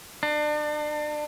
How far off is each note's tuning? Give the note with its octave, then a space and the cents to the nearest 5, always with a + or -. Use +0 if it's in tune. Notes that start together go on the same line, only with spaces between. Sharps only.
D4 +35